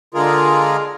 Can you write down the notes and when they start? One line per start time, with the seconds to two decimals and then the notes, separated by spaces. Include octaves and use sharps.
0.14 D3 G#3 F4 G#4 A#4